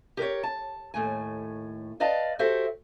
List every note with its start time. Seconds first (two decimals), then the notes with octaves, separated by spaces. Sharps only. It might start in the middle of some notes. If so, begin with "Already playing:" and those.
0.17 G4 A#4 B4 C#5
0.43 A5
0.94 D#2 A2 A3 G#5
2.00 B4 D5 D#5 F5 A5
2.39 F#4 G4 A4 C5 E5